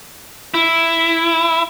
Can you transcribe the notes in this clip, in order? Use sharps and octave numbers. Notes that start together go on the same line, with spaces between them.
E4